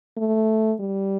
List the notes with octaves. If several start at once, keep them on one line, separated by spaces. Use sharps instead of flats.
A3
G3